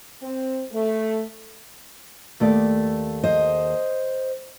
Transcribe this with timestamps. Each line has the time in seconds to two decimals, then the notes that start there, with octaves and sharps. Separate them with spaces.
0.21 C4
0.71 A3
2.40 D#2 A3 D5
3.24 C5 D#5